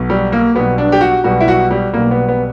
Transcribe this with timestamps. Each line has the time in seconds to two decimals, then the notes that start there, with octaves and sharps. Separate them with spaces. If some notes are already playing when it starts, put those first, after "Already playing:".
Already playing: B1 B2
0.10 G3
0.32 A#3
0.55 B1 B2 G3 B3
0.78 D4
0.92 G4
1.01 F#4
1.24 B1 B2 G3 F#4
1.40 E4
1.48 F#4
1.71 G3
1.93 B1 B2 G3 A#3
2.11 B3
2.28 B3